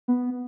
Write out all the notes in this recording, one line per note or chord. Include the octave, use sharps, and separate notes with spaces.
B3